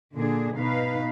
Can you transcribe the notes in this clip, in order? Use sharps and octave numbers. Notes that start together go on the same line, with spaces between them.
A#2 D3 D4 G#4
B2 D#4 B4 F5